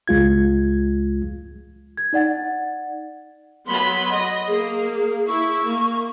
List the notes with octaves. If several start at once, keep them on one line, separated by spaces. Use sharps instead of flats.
C#2 G#3 F4 G#6
G#6
D#4 D5 F#5 A6
F#3 B3 B5 C6
D#5
A#3 G#4
E4 C#6
A#3